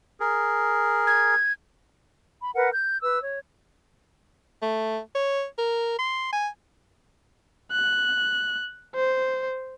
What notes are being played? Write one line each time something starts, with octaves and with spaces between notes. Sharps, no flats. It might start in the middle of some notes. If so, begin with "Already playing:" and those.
G#4 A#4
G#6
B5
A#4 B4 F#5
G6
B4 E6
C#5
A3
C#5
A#4
C6
G#5
F#6
C5